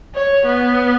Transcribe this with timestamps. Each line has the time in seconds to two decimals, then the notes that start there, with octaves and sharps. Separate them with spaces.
0.15 C#5
0.46 B3